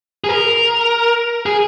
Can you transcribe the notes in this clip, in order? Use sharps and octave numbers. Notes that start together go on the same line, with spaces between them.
G#4
A#4
G#4